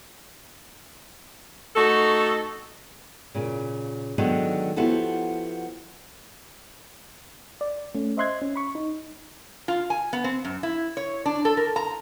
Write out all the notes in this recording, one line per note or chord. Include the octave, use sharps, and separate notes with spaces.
A3 D#4 F#4 A4
A#2 C#3
D3 D#3 F#3 G#3 B3 D#4
F3 B3 E4 F#4 G4 A4
D5
A3 C#4
C5 D#5 E5 C6 F#6 G#6
C#4
B5 C#6
D#4
F4
G#5
B3
C4
F#2
E4
C#5
D4
A4
A#4
A#5